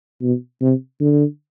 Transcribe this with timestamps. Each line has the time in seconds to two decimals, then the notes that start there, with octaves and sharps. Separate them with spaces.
0.22 B2
0.61 C3
1.00 D3